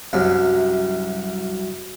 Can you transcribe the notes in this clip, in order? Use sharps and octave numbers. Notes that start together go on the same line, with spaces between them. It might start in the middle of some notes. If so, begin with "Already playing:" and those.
C2 F#2